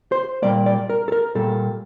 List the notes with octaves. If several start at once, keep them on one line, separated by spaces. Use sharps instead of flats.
C5
A#2 G3 A#3 D5
D5
A#4
A4
A#4
A#2 G3 A#3 A4